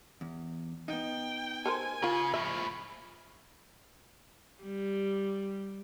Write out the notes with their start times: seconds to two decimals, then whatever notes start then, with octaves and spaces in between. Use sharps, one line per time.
0.21 E2
0.88 B3 D#4 G5
1.66 A4 A#4 C5 G#5
2.02 C#3 F4 A#4
2.34 A2 F3 E5
4.63 G3